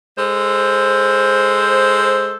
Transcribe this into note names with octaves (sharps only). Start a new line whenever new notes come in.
G#3 A4 C5